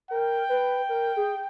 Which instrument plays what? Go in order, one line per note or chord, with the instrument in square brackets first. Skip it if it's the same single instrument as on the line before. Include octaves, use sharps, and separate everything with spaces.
[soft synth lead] A#4 [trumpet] G5
[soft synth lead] B4
A#4
G#4